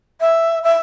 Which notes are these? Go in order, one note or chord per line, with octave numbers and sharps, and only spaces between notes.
E5
E5